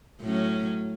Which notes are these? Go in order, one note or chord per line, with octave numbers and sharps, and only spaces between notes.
A2 F#3 C#4